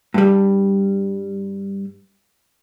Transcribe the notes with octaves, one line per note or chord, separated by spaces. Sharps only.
G2 G3